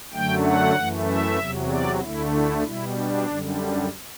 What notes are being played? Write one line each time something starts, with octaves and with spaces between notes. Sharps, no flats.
F#2 D3 F#3 A3 G5
F#5
F#2 E3 A3
E5
E2 C3 F#3
D5
D2 D3 A3 E4
E4
B2 G3 E4
D4
F#2 D3 G3
D4